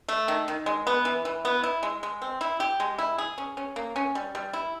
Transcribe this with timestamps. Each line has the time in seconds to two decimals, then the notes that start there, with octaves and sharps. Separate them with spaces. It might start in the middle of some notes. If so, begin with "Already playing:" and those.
0.08 A3
0.28 D#3
0.48 D#3
0.66 G#3
0.87 B3
1.05 E3
1.25 E3
1.45 B3
1.64 E4
1.83 G#3
2.03 G#3
2.22 C4
2.41 E4
2.60 G4
2.80 G#3
2.98 E4
3.18 G#4
3.38 C#4
3.57 C#4
3.76 A#3
3.96 C#4
4.15 G3
4.35 G3
4.53 E4